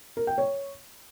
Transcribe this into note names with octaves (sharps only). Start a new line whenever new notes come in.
A#4
G5
C#5